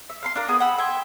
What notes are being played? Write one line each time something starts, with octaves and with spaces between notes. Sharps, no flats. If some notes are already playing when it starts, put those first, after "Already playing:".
E5
F5 B5 C6
D4 F4 A#4
B3 G#4 B5 D#6
F#5 G5 B5 E6
E5 G5 G#5 C6